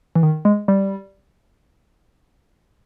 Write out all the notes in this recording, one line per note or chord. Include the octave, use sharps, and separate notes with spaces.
E3
D#3
G#3
G3